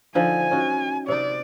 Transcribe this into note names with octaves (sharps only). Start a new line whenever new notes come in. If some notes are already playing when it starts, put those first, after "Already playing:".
D3 F3 D#4 G#5
C#4 D#4 F#4
C3 D#4 D5